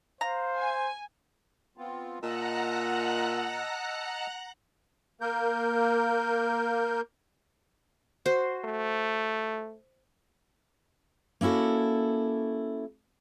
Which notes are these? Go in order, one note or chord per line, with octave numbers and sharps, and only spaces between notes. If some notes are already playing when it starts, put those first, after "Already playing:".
C5 F5 A#5
G#5
B3 C4 F4
A#2 D#5 F#5 A5 A#5 E6 F#6
A#3 A#4 G6
F#4 C5
A3
A#3 C#4 E4 F#4 A4